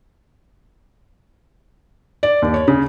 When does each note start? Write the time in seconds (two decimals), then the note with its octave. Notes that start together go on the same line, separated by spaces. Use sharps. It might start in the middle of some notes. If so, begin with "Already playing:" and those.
2.23 D5
2.42 D#2
2.54 C#5
2.68 C#3